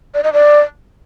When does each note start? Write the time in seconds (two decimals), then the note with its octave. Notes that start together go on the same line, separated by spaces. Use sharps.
0.14 D5
0.24 D#5
0.33 D5